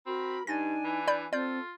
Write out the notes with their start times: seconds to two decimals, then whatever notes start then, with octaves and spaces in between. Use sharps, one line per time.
0.07 C4 F#4 A#4 B5
0.47 G2 D4 D#4 G#5 A6 A#6
0.84 E3
1.08 D5 B5 G6
1.33 C4 F4 A4 D5 G6